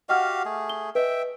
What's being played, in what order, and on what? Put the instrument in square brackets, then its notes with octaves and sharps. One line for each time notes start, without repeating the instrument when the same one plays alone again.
[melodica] F#4 G4 F5 [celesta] D#5 F#5 F6
[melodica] A3 G#4
[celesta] G7
[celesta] B4 D#5 [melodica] E5 G5